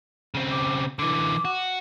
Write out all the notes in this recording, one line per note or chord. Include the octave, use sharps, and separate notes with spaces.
C#3 C4
D6
D3 E3 D6
F#4